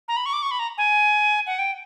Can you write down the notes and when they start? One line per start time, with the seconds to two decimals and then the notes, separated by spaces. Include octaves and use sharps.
0.08 A#5
0.16 B5
0.26 C#6
0.33 D6
0.42 C#6
0.51 B5
0.59 A#5
0.78 G#5
1.47 F#5
1.59 G5